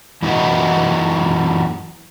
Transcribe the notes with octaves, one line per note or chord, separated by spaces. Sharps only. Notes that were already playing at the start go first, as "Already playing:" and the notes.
F#2 E3 A#3 E4 F#4 D#5